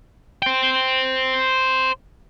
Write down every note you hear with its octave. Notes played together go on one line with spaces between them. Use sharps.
C5 G5